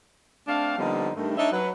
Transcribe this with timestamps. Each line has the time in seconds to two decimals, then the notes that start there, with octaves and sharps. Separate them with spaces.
0.48 A3 C4 D4 F5
0.78 D3 F3 G3 A#3 B3 D#4
1.16 G2 D#3 A3
1.38 D4 D#4 C#5 D#5 E5
1.52 F#3 B4